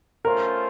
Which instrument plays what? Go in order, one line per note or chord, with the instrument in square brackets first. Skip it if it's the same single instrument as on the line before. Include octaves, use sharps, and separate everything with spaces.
[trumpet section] A3 C#4 F4 C5 [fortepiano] A#4